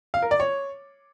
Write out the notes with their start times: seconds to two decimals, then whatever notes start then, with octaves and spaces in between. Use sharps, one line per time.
0.14 F5
0.22 A#4
0.31 D5
0.40 C#5